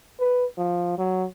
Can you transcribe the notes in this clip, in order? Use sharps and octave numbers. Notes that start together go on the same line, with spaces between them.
B4
F3
F#3